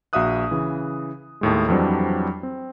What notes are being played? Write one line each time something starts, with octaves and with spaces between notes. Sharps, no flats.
A#1 F#4 E5 F5 D#6 F#6
C#3 E3
D#2 A2 G#3
F2 E3 F#3 G3 C4 D4
C4